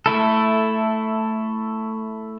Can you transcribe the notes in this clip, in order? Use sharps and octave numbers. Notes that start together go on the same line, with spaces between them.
A3 E4 A4